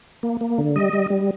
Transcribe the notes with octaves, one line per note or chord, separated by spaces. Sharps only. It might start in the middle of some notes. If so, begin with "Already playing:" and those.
A#3
A#3
D3
G3 D#5
G3
G3